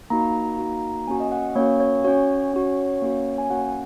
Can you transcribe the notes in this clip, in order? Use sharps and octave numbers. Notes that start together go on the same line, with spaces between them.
A#3 D#4 F#4 A#5
A#3 D#4 F#4
A#3 C#4 F#4 G#5
D#5
F#5
A#3 C#4 F#4 C#5
C#5
C#4 F#4 C#5
C#4 F#4
A#3 C#4 F#4
G#5
A#3 C#4 F#4 F#5